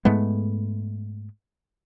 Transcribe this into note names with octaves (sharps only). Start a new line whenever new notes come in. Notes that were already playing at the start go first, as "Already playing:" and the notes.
G#2 G#3 A3 B3